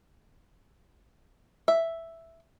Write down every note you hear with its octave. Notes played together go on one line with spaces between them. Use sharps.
E5